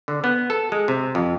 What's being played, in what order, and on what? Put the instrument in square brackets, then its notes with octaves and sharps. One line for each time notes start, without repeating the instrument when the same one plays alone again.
[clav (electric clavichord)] D3
B3
A4
G#3
C3
F2